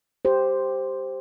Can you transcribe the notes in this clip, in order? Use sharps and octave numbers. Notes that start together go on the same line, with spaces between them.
G4 C5